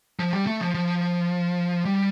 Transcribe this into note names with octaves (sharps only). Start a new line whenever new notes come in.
F3
G3
A3
F3
F3
G3